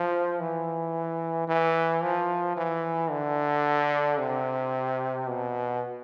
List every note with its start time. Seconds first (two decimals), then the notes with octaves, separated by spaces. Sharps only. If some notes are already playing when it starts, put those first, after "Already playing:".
Already playing: F3
0.39 E3
1.48 E3
2.02 F3
2.57 E3
3.10 D3
4.18 C3
5.27 B2